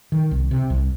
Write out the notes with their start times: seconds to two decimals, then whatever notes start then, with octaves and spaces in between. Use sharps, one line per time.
0.12 D#3
0.31 C2
0.51 C3
0.70 C2